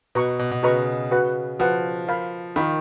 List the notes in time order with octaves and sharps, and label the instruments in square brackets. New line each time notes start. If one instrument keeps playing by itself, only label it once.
[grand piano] B2 [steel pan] F#4 B4 D#5 A#5 C#6
[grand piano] B2
B2
[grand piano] C#3 [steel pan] F#4 B4 D#5 A#5 C#6
[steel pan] F#4 B4 F#5
[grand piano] F3 [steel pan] F#4 B4 F#5
[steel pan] F4 A#4 F5 B5
[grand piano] D#3 [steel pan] F4 A#4 F5 B5